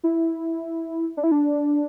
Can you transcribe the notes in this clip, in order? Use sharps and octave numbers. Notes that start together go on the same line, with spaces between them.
E4
D4
E4
D4